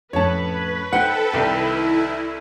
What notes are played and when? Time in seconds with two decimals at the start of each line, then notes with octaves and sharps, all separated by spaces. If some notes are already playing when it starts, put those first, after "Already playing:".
0.13 F2 A2 C#4 B4 C#5 A5
0.93 D#4 A4 C5 F#5 G5 F#6
1.33 C2 D#3 E4 G5